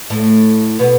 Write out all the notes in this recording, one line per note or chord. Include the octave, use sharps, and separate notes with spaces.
A2 A3
B2 B3